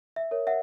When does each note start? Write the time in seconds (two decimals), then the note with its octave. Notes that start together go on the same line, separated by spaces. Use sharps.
0.16 E5
0.31 A#4 C#5
0.47 E5 F#5